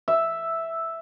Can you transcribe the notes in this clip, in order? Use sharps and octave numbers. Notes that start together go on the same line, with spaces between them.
E5